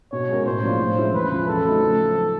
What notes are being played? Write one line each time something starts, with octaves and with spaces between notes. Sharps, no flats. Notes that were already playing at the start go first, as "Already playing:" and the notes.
B2 C#5
G#3 C#4 F#4 A#4
A2 C5
F3 A#3 D4 F4
A2
F3 G#3 C#4 E4
E2 B4
C#3 F3
C#3 A4
F#3 A3 C4 D#4
F3